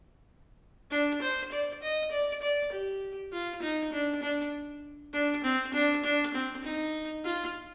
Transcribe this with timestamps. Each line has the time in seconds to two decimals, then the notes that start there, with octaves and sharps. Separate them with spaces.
0.91 D4
1.22 C5
1.52 D5
1.82 D#5
2.12 D5
2.42 D5
2.72 G4
3.33 F4
3.62 D#4
3.92 D4
4.22 D4
5.13 D4
5.44 C4
5.73 D4
6.04 D4
6.34 C4
6.64 D#4
7.25 F4